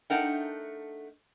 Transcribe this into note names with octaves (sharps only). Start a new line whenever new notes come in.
A3 D4 D#4 A#4 F#5 G5